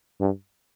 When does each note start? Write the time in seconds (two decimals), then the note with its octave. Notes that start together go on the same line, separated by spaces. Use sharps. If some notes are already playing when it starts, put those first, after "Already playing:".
0.20 G2